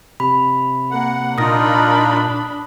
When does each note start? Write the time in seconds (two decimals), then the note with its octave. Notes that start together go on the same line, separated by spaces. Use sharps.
0.20 C3 B5
0.91 A#3 F#5
1.38 A#2 D4 D#4 F4 A#4 B5 D#6 A#6